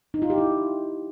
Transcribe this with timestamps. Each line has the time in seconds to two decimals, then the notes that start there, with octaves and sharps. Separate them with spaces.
0.14 D#4
0.22 F4
0.30 G4
0.38 E4